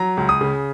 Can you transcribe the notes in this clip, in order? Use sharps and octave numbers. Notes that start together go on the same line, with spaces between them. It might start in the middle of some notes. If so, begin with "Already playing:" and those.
Already playing: F#3 A#5
C#2
D#6
C#3